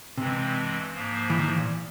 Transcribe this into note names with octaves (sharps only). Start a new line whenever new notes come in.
G2 C3 E3 G#3 C4
G#2 F3 A#3
E3
D#3
E3
A#2